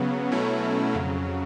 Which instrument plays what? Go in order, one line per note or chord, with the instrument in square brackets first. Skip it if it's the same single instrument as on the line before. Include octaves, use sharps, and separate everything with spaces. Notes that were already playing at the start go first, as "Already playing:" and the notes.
Already playing: [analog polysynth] C#3 F#3 B3
B2 F#3 A3 C#4 E4
F2 C#3 F#3